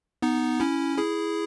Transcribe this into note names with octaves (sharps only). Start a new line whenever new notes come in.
B3 D#4
C#4 E4
E4 G#4